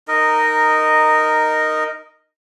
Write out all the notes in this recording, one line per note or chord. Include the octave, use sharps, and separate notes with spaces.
D#4 A#4 D#5